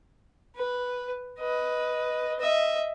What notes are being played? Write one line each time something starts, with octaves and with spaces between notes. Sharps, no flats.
B4
B4 D#5
D#5 E5